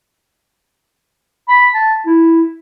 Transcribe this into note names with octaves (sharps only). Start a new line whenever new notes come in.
B5
A5
E4